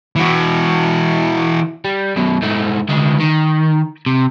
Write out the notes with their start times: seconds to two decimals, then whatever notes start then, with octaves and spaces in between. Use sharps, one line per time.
0.16 E3 F#4
1.84 G3
2.17 F#2 B2
2.42 G#2 A3
2.89 D2 G#3
3.20 D#3
4.06 C3